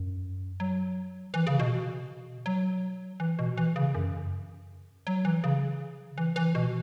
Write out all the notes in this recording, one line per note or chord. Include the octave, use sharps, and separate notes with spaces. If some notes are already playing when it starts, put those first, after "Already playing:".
Already playing: F#2
F#3
E3
C#3
B2
F#3
E3
B2
E3
C#3
F#2
F#3
E3
C#3
E3
E3
B2